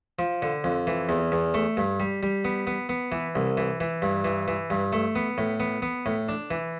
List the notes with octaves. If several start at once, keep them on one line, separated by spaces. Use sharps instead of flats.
F3
D3
F2
E3
E2
E2
A3
G2
G3
G3
B3
B3
B3
E3
C2
E3
E3
G2
E3
E3
G2
A3
B3
A2
B3
B3
A2
D4
E3